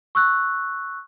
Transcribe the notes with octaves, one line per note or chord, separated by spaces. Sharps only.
C#6 E6 F#6